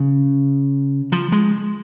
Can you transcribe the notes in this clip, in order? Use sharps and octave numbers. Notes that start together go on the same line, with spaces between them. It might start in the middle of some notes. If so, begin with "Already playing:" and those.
Already playing: C#3
F3
G#3